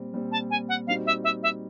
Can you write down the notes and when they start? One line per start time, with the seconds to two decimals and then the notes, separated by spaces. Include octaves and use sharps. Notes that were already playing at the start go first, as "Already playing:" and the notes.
Already playing: A#2 G3 C4
0.13 A#2 G3 C4
0.32 A5
0.50 G#5
0.69 F#5
0.87 A#2 G3 C4 D#4 F#4 F5
1.06 E5
1.24 E5
1.43 E5